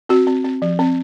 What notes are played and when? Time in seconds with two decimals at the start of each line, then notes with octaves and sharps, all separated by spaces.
0.09 C4 F#4
0.27 C4
0.45 C4
0.62 F3
0.79 C4